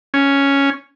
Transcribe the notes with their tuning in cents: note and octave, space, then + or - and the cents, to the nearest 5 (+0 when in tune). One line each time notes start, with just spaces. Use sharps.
C#4 +5